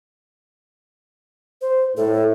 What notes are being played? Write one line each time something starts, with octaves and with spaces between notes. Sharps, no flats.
C5
A2 A4